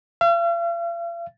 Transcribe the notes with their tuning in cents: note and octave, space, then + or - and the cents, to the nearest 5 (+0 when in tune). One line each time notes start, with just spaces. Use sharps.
F5 -45